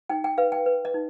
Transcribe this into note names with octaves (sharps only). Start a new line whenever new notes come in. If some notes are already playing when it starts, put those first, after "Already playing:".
D#4 G5
G5
B4 F5
G5
B4
D#5
D#4